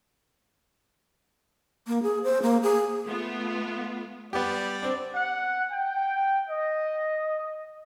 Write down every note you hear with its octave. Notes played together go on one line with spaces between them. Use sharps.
A#3
G#4
C5
A#3
G#4
A3 B3 F4
G3 B3 G4 D5
C4 D4
F#5
G5
D#5